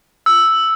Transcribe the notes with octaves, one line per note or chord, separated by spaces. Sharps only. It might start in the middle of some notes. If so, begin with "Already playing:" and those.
E6